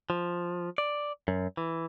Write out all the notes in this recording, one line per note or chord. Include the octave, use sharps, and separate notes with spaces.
F3
D5
F#2
E3